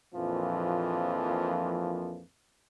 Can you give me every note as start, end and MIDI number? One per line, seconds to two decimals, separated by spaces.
0.15 2.24 34
0.15 2.24 41
0.15 2.24 46
0.15 2.24 52
0.15 2.24 53